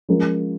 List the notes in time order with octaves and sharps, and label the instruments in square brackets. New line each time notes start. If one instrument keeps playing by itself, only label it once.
[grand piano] F3 G#3 C#4 F4 A#4